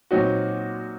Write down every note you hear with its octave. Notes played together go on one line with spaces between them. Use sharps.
A#2 F#3 C4 D#4 F#4